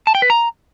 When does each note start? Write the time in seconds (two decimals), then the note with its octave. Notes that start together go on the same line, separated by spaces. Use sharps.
0.07 A5
0.15 G5
0.22 B4
0.30 A#5